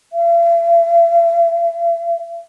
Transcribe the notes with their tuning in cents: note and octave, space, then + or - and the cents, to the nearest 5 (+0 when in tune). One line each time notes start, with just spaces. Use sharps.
E5 +45